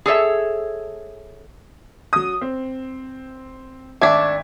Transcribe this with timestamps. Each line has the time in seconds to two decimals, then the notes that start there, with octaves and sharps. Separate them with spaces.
0.06 G#4 A4 C#5 E5
2.13 F#3 D#6
2.41 C4
4.01 G#1 A3 D4 E5 G#6